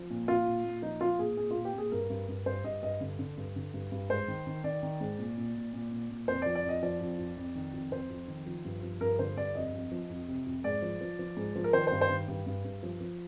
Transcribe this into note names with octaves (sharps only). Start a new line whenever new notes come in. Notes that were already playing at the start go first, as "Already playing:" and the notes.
Already playing: F3
A#2
A#2 F4
A#2
A#2
F3 D#4
F3 F4
A#2 G#4
A#2 G#4
A#2 F4
G4
A#2 G#4
G2 A#4
G2
G2
G2 C5
G2 D#5
G2 D#5
D3
D3
G2
D3
G2
G2
G#2 C5
D#3
D#3
D#3 D5
D#3
G#2
A#2
A#2
A#2
A#2
A#2
A#2
F2 C5
F3 D5
D5
F2 D#5
F3 D5
F2
F2
F2
D#3
F2
F2 C5
F2
D#3
F3
G2
F3
G2 A#4
D3 C5
G2 D5
F2 D#5
F2
F3
F2
C3
F2
G#2 D5
F3
F3
F3
G#2
F3
A#4
D#3 C5
G2 C5
C5
D#3
G2
G2
G2
F3
F3